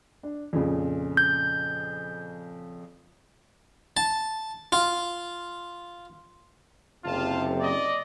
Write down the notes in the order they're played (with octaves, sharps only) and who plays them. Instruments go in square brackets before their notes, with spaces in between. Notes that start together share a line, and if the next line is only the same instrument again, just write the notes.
[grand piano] D4
F2 A#2 C#3
[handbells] G6
[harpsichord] A5
F4
[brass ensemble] F#1 C3 [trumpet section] F4 A5
[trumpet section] D5 D#5